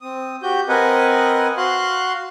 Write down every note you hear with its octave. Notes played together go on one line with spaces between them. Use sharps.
C4 D#6
F#4 G4 G6
C4 A#4 B4 D#5 F#5 G#5
F#4 F5 C6 F#6